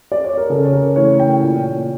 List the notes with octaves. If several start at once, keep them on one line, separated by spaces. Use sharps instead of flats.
D5
C#5
A#4
C#3 A4
C#5
A#4
E3 A3 C#5
G5
A#2